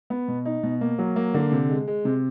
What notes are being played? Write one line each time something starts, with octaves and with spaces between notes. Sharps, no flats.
B3
B2
D#4
B2
A#3
F#3
A#3
D3
C3
G#3
G#3
C3